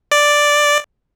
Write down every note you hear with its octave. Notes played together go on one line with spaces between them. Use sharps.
D5